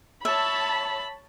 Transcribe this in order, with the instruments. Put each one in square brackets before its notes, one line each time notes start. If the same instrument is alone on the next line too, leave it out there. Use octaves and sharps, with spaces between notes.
[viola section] C#5 A5 [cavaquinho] E5 [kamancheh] B5